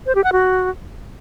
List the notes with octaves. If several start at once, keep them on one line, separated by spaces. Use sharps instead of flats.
C5
G4
F#5
F#4